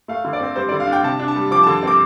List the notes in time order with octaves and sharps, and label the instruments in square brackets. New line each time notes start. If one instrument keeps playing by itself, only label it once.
[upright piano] A3 F5
D3
D5
C4
G3 C5
D3 D5
F5
D4
G5
C3 A5
D4
A5
G3
F3 D6
D3 A5
C4 D6